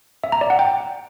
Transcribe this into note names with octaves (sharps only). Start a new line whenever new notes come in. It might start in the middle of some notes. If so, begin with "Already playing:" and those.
E5
A#5
D5
F#5
G5